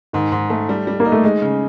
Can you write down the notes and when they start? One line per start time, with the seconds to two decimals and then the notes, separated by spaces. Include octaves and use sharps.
0.13 G#2 D#3
0.32 G#2
0.50 A3
0.69 G3
0.87 G3
1.00 A#3 D#4
1.12 A3
1.24 G#3 D#4
1.42 C#3